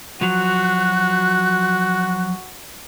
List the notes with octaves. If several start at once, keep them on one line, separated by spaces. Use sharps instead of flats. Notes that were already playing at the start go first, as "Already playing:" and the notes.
F3 F#3 F#4 F#6